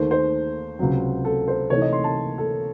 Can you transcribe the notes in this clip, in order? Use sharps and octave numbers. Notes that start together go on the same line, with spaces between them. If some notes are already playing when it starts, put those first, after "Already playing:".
Already playing: D#2 D#3 A3 C5
C5
C#2 C3 F#3
A4
C5
C3 E3 A3 D#4 C#5
D#5
C6
A5
A4